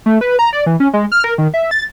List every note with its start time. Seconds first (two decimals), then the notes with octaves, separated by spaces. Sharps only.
0.06 A3
0.21 B4
0.39 A#5
0.53 D5
0.66 E3
0.80 C#4
0.93 G#3
1.12 F6
1.24 A#4
1.38 D#3
1.54 E5
1.71 A6